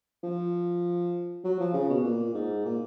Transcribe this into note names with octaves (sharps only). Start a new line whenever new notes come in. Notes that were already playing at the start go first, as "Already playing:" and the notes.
F3
F#3
F3
C#3
B2
A#2
G#2
A#2